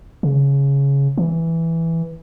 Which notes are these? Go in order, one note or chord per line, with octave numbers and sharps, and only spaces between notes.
C#3
E3